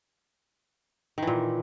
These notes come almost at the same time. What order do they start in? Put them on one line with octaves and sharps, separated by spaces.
D#3 E3 A#2